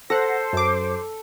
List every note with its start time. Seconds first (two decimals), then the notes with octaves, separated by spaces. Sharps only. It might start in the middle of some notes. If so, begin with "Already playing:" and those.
0.10 A4 C5 F#5 A#6
0.53 F#2 D6